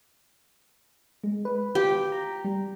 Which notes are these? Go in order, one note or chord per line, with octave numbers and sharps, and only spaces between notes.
G#3
B4
F4 G4
A#5
G3